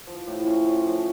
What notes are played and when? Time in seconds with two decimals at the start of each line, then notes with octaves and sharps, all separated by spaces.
0.07 F3
0.27 A2
0.47 C#4
0.67 F4
0.87 F3